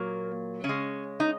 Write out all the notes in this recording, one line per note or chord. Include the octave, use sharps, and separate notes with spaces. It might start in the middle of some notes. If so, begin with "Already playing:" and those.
Already playing: A#2 F#3 A#3
C#3 C#4
G#3
D#4